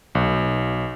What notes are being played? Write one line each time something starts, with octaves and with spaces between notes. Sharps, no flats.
B1